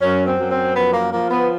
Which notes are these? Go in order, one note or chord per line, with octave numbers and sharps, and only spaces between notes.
F#2 C#4
C4
F#2
C4
F3 B3
A#3
F3 A#3
B3